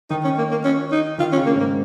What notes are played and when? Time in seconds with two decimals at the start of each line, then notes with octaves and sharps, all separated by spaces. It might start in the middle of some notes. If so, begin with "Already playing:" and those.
0.10 D#3 D#4
0.24 C#4
0.38 A#3
0.51 A#3
0.64 C#4
0.92 D#4
1.18 D#3 F4
1.32 C#4
1.37 C#3
1.46 A#3
1.55 G#2
1.60 A#3